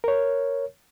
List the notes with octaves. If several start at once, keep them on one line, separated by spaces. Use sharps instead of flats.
A#4 C#5